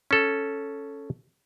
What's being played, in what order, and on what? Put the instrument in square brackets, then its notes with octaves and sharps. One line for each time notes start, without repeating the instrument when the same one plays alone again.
[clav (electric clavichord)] C#4 A4